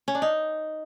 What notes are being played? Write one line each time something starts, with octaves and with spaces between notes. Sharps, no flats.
C#4
D4
D#4